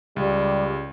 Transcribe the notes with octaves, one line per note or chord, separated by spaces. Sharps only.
C#2 G3